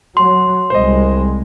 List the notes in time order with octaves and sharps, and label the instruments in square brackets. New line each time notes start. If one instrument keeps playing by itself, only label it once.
[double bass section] F#3 [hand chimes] C6
[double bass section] C2 G#3 [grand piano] C5 D#5